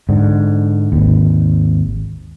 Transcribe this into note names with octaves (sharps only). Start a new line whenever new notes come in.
G#2 D3
G#1 D#2